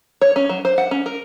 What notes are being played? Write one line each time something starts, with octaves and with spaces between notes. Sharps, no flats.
C#5
C#4
F#3
C5
F#5
C#4
A#4